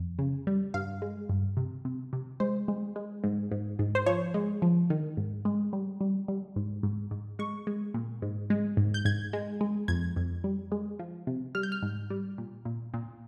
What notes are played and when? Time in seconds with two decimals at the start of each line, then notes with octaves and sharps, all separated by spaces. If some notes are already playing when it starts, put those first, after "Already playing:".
Already playing: F2
0.19 C#3
0.47 G3
0.74 G2 F5
1.02 G#3
1.29 G2
1.57 C3
1.85 C3
2.13 C3
2.40 G#3 C5
2.68 G#3
2.96 G#3
3.24 G#2
3.52 G#2
3.79 G#2
3.95 C5
4.06 F3 C#5
4.34 G#3
4.62 F3
4.90 D#3
5.17 G#2
5.45 G#3
5.73 G3
6.01 G3
6.28 G3
6.56 G#2
6.83 G#2
7.11 G#2
7.39 G#3 C#6
7.67 G#3
7.94 A#2
8.22 G#2
8.50 G#3
8.77 G#2
8.94 G6
9.05 G#2 G#6
9.33 G#3
9.61 G#3
9.88 F2 G#6
10.16 F2
10.44 G3
10.72 G#3
10.99 F3
11.27 C3
11.55 G3 F6
11.63 G6
11.72 F6
11.82 G#2
12.10 G3
12.38 A#2
12.65 A#2
12.94 A#2